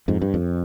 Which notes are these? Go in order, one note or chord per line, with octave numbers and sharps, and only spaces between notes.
F2 G#2
G2
F2